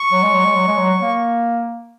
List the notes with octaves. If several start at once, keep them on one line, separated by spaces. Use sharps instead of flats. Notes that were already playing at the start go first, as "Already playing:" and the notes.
Already playing: C#6
F#3
G#3
F#3
G#3
F#3
G#3
F#3
A#3